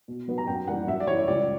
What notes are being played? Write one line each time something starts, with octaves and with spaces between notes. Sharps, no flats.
B2
F#3 B3
A#5
F#2 G5
E3 G3 A#3 F#5
F#2 E5
D5
E3 G3 C#5
C#2 D5